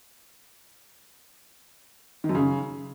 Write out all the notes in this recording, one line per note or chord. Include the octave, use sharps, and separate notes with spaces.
D#3
F#2
C#3